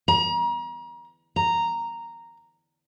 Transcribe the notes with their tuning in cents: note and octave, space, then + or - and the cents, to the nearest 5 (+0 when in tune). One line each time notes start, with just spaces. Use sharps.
A#5 +35
A#5 -5